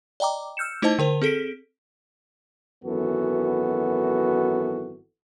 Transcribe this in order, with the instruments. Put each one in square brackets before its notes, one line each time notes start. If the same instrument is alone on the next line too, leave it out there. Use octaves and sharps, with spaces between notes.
[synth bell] D5 D#5 G5 A#5 D6
E6 F6 G6 C#7 E7
A3 D#4 E4 C5 D#5 A5
D3 A#4 C5
C4 G#4 A4 B6 D7
[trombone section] G#1 F#2 E3 B3 F#4 A4